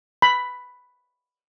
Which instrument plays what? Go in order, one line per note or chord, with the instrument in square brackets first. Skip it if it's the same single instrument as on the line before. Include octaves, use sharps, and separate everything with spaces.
[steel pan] B5